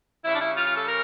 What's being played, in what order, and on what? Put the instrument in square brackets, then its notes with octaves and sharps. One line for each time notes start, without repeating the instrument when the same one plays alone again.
[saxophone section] C#3 G3 C#4 E4
D4
E4
F4
F4
A4
A#4